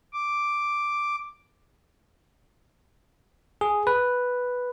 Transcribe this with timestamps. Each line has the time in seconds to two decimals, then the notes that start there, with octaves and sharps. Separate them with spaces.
0.13 D6
3.61 G#4
3.87 B4